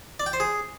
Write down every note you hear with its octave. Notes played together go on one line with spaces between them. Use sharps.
D5
G5
C5
G#4